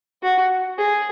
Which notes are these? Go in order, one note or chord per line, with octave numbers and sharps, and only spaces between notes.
F#4
G#4